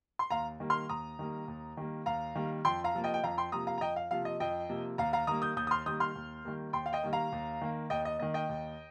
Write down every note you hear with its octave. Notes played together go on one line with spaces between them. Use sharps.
C6
D#2 F5 A#5
D#3 G3 A#3
C6 F6
D#2 A#5 D#6
D#3 G3 A#3
D#2
D#3 G3 A#3
D#2 F5 A#5
D#3 G3 A#3
F2 G5 C6
F5 A#5
C3 F3 A#3
D#5 G5
G5
F2 F5 A#5
G5 C6
C3 F3 A#3 A#5 D#6
F5 A#5
A#5
F2 D#5 G5
F5
C3 F3 A#3 F5
D#5
F2 D#5 G5
C3 F3 A#3
D#2 F5 A#5
F5 A#5
D#3 G3 A#3 A#5 D#6
D#6 G6
D#2 D#6 G6
D#6
C6 F6
D#3 G3 A#3 D#6 G6
C6 F6
D#2
D#3 G3 A#3
D#2 G5 C6
F5
D#5 G5
D#3 G3 A#3
F5 A#5
D#2
D#3 A#3
D#2 D#5 G5
D#5
D#3 A#3 D#5
D#5 G5
D#2